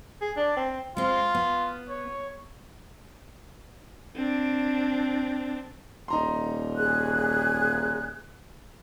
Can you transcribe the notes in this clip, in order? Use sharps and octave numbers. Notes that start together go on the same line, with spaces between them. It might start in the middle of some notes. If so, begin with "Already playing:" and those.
G#4
D4
C4
G#3 C4 F4
B3
C#5
C4 D4
D#1 D#4 A#5 C6
G#4 F#6